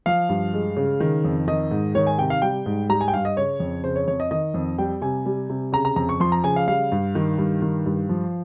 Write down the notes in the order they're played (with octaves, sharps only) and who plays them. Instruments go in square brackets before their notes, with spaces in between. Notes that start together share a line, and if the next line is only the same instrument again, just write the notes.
[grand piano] F3 F5
G2
G#3
C#3
D#3
F2
D#3 D#5
G#2
D#3 C#5
G#5
C3 G5
F5
G3 G5
G#2
G3 A#5
G#5
G5
G2 F5
D#5
C#3 C#5
F2
C#3 C5
C#5
F2 C#5
D#5
D#3 D#5
F2
G3 G5
C3 G#5
G3
C3
C#3 A#5
A#5
F2 A#5
C#6
F3 C6
A#5
C#3 G#5
F5
G3 F5
G2
D#3
G2
D#3
G2
F3